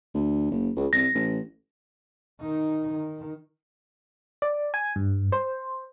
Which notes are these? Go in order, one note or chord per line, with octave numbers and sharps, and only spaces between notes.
D2
F#1
C#2
C2 A#6
A1
D#3 D#4
D#3
D5
G#5
G2
C5